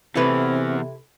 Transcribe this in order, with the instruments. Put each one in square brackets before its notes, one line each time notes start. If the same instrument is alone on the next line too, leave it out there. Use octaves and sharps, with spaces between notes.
[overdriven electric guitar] E2 E3 [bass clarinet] C3 [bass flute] C4 [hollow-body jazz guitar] E4 A4 B4